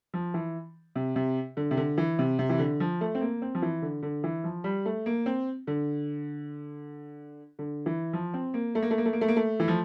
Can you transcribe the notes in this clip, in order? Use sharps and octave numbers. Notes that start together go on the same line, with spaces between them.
F3
E3
C3
C3
D3
C3
D3
E3
C3
C3
E3
D3
F3
A3
C4
A#3
C4
F3
E3
D3
D3
E3
F3
G3
A3
A#3
C4
D3
D3
E3
F3
C4
A#3
A3
A#3
A3
A#3
A3
A#3
A3
A#3
A3
E3
F3